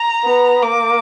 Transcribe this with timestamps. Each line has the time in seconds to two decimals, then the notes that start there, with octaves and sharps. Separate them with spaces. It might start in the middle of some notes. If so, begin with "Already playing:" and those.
Already playing: A#5
0.24 B3
0.62 A#3 D6